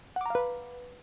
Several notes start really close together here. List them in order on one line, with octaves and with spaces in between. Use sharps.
F#5 D6 A#5 F5 B4